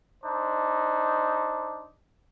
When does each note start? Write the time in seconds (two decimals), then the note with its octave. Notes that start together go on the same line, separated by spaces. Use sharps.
0.23 D4 D#4 C5